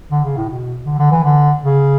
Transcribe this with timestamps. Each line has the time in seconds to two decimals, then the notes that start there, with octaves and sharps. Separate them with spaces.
0.11 D3
0.24 C#3
0.37 A2
0.49 B2
0.86 D3
0.99 D3
1.11 E3
1.24 D3
1.62 C#3